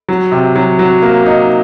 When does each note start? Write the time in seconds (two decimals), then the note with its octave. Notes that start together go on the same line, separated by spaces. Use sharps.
0.09 F#3
0.32 C3
0.56 F#3
0.79 F#3
1.02 A#3
1.26 D#4